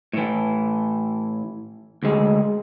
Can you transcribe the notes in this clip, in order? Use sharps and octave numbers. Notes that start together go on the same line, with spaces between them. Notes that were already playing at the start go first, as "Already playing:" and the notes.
A2 E3
D2 G#3